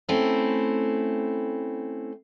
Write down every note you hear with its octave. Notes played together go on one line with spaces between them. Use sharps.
A3 C4 C#4 E4